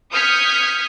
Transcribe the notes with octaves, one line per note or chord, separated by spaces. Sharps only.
D#6 F6 G6 G#6 B6 C#7